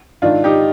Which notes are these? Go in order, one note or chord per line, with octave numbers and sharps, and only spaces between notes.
G#2 D#3 D4 F4
D#4 G4